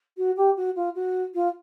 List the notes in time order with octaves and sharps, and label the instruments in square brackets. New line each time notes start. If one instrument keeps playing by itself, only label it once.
[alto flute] F#4
G4
F#4
F4
F#4
F4